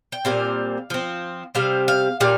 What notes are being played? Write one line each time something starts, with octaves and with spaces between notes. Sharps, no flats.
G5
A#2 G3 C4 F5
F3 C4
C3 G3 C4 F5
F5
A#2 G3 F5